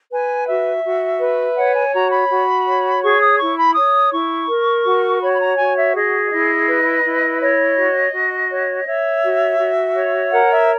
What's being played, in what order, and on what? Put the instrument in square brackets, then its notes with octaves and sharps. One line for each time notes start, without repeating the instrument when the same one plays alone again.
[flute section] B4 G#5
F#4 E5
F#4
B4
C#5 F#5
G#5
F#4 A#5
B5
F#4
C#5
G#4 C#6
D#6
E4 C#6
B5
C#5 D#6
E4 C#6
A#4
F#4
C#5 B5
B5
A#5
F#4 G#5
E5
G#4 D#5
E4 D#5
B4
E4
C#5 D#5
F#4
F#4
C#5
C#5 E5
F#4
F#4
C#5
A#4 F#5
E5